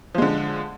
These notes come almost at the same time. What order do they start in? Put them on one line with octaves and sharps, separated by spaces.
F3 G#3 D3